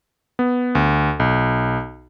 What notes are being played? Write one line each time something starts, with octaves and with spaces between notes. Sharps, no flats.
B3
D2
B1